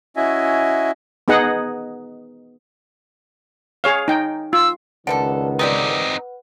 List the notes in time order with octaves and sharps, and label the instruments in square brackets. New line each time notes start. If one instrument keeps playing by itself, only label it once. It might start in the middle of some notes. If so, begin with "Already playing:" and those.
[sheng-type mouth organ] C#4 E4 F#4 D#5 E5 G#5
[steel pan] B3 D#4 G#4 D#5 F#5
G#4 C#5 F5
D#4 G5
[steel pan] F4 [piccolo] E6
[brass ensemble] C#2 D#3 [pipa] D3 G3 A4 [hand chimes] B4 F#5
[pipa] B3 G4 D5 [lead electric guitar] C4 D#4